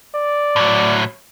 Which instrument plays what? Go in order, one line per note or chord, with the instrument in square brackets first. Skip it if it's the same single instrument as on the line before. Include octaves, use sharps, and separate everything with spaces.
[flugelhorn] D5
[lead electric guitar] A2 F#3